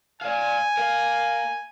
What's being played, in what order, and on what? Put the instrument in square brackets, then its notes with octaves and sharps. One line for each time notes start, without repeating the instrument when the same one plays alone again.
[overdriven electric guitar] D5 F5 [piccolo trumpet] G#5
[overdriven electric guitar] A#4 F5